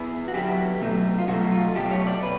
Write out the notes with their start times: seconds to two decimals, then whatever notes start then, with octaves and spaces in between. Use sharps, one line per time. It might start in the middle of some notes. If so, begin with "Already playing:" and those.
Already playing: B3 E4 G#4
0.28 F#4
0.34 D3 F#3 B3 E4 G4
0.81 B2 F#3 A3
1.18 F4
1.28 B2 F#3 A3 F#4
1.52 F4
1.75 B2 F#3 A3 G4
1.91 C#5
2.07 D5
2.22 B2 B4